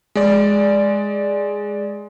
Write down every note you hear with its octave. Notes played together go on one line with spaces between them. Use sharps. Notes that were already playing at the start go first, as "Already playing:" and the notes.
G#3 D5